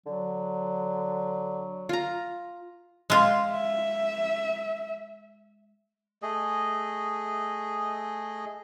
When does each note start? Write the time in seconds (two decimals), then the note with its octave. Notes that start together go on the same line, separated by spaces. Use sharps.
0.06 D3 F#3
1.89 F4 A#5
3.10 G#3 F4
3.51 E5
6.22 A3 G#4 D#5